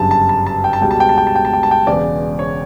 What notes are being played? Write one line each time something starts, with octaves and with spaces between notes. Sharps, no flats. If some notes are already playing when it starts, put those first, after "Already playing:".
Already playing: G1 F#2 C#3 G3 A5
A5
A5
A5
G5
A5
C#2 B2 G3 G5
A5
G5
A5
G5
A5
G5
A5
G5
A5
G5
E1 E2 C#3 D5
C#5